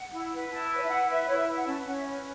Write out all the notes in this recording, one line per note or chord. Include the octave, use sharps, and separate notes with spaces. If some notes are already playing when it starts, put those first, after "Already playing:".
Already playing: F#5
E4
B4
E4 A5
B4 C#5
E5
E4 F#5
B4 E5
E4 C#5
E5
B4
F#5
C#4 A5
C#4 F#5
E5
B4 C#5